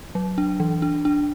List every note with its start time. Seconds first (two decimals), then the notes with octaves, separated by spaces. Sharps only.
0.15 F#3
0.38 D4
0.60 E3
0.82 D4
1.05 D4